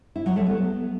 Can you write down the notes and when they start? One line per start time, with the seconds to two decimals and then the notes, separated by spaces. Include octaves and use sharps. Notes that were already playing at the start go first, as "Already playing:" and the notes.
0.16 E4
0.26 F#3
0.36 A3
0.46 B3